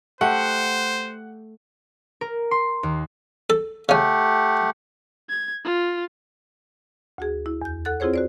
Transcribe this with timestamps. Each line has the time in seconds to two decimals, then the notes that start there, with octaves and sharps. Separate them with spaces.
0.21 A3 G4 C5 F#5
2.21 A#4
2.51 C6
2.83 D#2
3.50 A4
3.89 C#3 A3 C#4 G4 F#5
5.29 G#6
5.64 F4
7.18 D2 F#4 G#4
7.46 E4
7.62 E2 G6
7.85 A4 F#5 F#6 A6
8.00 C4 E4 F4 G#4 C5 C#5
8.14 F#4 C5 D5